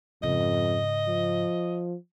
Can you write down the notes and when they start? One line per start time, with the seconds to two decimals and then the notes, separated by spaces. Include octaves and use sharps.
0.23 F2 G#2 C#3 D#5
1.08 F3